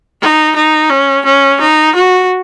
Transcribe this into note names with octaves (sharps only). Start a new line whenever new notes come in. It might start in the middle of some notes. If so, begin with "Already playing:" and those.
D#4
D#4
C#4
C#4
D#4
F#4